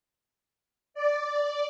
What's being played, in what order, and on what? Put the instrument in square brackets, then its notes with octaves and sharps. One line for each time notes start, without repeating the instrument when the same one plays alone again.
[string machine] D5